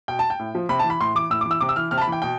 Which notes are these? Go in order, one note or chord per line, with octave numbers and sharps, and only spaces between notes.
B2 G5
A5
G5
A2
F3
C3 B5
A5
E3
B5
A2 C6
E3 D6
A2 E6
E3 D6
E6
C3 D6
E6
E3 F6
C3 F6
A5
B5
E3 G5
B2 G5